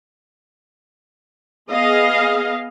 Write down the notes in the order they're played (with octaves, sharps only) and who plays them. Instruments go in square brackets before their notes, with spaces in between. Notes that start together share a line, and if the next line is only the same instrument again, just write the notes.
[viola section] B3 G#4 D#5 F5